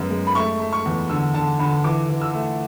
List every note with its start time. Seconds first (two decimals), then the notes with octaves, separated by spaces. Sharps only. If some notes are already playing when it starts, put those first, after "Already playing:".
Already playing: F#2 G#3 B3
0.11 G#3
0.27 B5
0.35 A3 C#6
0.60 A3
0.73 C#6
0.86 E2
1.10 D3 E6
1.34 D3 A5
1.59 D3 B5
1.84 E3 D6
2.09 E3
2.22 E6
2.34 A3